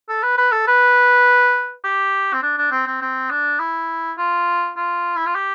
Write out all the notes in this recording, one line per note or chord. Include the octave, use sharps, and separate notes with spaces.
A4
B4
B4
A4
B4
G4
C4
D4
D4
C4
C4
C4
D4
E4
F4
F4
E4
F4
G4